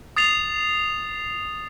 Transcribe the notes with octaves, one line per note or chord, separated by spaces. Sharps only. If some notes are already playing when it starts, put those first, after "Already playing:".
D#6 A6 C7 F7